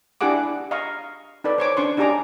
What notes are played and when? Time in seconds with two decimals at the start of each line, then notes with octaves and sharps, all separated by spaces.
0.21 D4 E4 G4 G#4 F#5 D6
0.71 D#5 F5 A#5 C#6
1.44 D#4 A4 B4 D5
1.58 C5 C#5 D6
1.77 C#4 D4 C6 C#6
1.97 D4 D#4 G4 G#4 A#5 D6